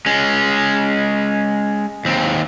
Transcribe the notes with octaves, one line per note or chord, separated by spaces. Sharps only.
G#3 C#4
D#2 C4